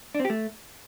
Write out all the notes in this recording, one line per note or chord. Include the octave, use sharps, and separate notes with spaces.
D4
C4
G4
A3